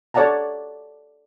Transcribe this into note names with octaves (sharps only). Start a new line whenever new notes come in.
A4 C#5 D5 F#5 A5 A#5